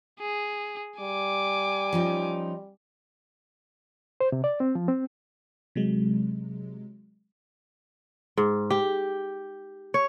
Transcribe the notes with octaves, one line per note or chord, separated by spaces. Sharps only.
G#4
G3 G#5 D6
F3 C#4 D#4
C5
C3
D5
C4
F3
C4
C3 F#3 G#3
G#2
G4
C#5